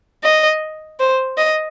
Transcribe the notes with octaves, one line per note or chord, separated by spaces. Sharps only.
D#5
C5
D#5